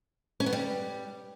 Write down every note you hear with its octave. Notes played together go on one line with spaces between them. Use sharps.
C#4
B3
G3